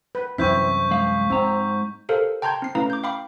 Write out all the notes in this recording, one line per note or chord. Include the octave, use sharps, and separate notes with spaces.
B4
C2 F#2 E3 C4 E4 C#6 G6 B6
G#3 F5
G#2 C4 A#5
G4 A4 A#4 C5 F5
G5 A5 A#5 C6 G6 G#6
C4 C7
A3 C#4 E4 B4 F5 A#5
D6 G6
F5 G5 B5 D6